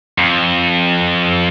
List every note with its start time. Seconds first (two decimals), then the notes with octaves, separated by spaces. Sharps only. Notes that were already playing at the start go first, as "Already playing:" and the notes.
0.18 F2